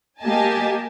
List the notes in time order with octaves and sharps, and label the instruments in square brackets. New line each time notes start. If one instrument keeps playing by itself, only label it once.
[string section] A#3 G4 D#5 G#5 A5